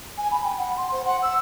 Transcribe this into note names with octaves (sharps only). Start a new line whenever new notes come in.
G#5
B5
G5
F#5
C6
C5
F#5
E6